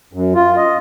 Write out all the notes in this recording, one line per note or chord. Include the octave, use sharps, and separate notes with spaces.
F#2
F4
D#5